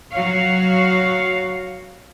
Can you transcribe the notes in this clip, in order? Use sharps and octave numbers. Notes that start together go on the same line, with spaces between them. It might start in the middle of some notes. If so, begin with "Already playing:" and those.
F#3 F#4 C#5 F5